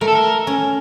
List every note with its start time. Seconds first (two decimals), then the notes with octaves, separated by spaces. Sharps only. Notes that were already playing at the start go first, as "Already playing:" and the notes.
0.01 A3 A#4
0.08 A4
0.15 A#4
0.47 C#4